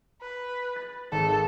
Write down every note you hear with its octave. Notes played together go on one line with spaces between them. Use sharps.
B4
A6
G#1 A4